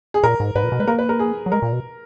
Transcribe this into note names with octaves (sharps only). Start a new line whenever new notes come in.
G#4
A#2 A#4
G#2
G#2 B4
A#2
B2
G#3 B4
A#3 A#4
B4
A#4
G#4
F#3
G#3 A#4
A#2
B2